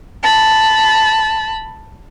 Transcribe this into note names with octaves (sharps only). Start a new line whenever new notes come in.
A5 B5